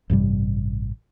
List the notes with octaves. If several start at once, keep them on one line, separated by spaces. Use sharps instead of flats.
A1 G2 C3 G3